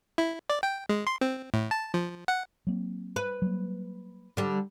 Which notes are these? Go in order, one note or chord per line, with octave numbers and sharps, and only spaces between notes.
E4
D5
G5
G#3
C6
C4
A2
A5
F3
F#5
F#3 A#3 C4
B4
F#3 G3 A#3
D3 G3